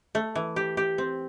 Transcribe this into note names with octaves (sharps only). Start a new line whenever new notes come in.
A3
E3
G4
G4
C4